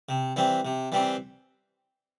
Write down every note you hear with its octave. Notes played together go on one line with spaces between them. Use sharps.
C3
E3 G3 C4
C3
E3 G3 C4